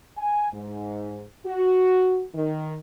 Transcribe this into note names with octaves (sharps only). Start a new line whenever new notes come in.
G#5
G#2
F#4
D#3